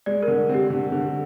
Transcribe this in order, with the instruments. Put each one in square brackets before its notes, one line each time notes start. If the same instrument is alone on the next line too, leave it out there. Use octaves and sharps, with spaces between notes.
[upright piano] G#3 [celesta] D5
[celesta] A#4
[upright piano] D3
[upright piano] C4 [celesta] G4
[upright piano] D3
D3